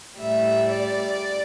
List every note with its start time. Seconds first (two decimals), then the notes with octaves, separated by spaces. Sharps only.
0.19 A2 G3 E5
0.69 D5